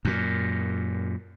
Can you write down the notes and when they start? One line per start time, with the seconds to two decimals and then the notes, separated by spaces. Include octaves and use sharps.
0.05 F#2 A#2